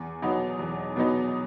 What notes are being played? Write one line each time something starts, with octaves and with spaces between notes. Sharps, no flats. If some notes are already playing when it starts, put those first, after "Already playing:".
Already playing: E2
B2 F#3 B3 D#4
E2
B2 F#3 B3 D#4